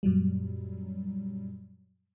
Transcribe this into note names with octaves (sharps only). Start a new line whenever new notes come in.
F#2 A#2 F#3 G3